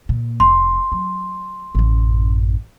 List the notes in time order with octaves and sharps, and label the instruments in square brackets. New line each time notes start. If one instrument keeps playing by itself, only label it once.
[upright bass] A#2
[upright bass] F1 [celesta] C6
[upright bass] F#3
A1 F#2